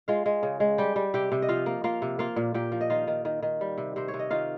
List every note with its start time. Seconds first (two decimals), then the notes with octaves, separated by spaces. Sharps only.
0.08 G#3 F4 F5
0.26 G#3
0.43 C#3
0.60 G#3
0.78 G3 G4 G5
0.96 G3
1.14 C3 G4 G5
1.32 C3
1.42 D#5
1.48 F3 F4 F5
1.66 A#3
1.84 A#3 F4 F5
2.02 C3
2.19 A#3 F4 F5
2.36 A#2
2.54 A#2 G4 G5
2.72 F3
2.81 D#5
2.90 D#3 F4 F5
3.07 D#3
3.25 D#3
3.43 D#3
3.61 G3
3.78 C3
3.96 C3 C5
4.08 C#5
4.14 C3
4.19 D#5
4.31 D#3 F4 F5